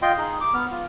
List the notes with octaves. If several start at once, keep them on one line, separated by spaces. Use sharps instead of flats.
F4 D#5 G5 C6
D#4 G#4
D6
B3 F6
F4